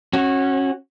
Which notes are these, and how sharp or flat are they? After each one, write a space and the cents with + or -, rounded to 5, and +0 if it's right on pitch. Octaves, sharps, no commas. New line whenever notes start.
C#4 -25 F#4 +0